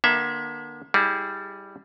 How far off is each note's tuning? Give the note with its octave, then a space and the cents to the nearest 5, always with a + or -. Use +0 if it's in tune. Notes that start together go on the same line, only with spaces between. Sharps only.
D3 +35 A#3 +35 E5 +0
G3 +0 E4 -35 G#4 +0